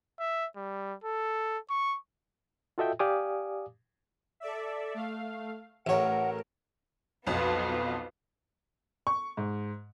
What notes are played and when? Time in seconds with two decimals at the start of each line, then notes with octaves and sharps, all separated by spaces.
0.20 E5
0.57 G3
1.04 A4
1.70 C#6
2.78 F4 F#4 A4 D#5 E5 G5
2.99 G4 D5 F5 G#5 D6 D#6
4.40 A4 D5 E5
4.94 A3 F5
5.87 A1 A3 A#4 C#5 F#5
7.27 B1 F2 B3 F4
9.07 C#6
9.37 G#2